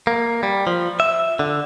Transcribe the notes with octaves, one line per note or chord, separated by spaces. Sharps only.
A#3
G3
F3
E5
D3